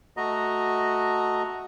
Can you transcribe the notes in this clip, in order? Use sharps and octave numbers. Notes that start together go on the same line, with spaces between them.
A3 F#4 D#5 A#5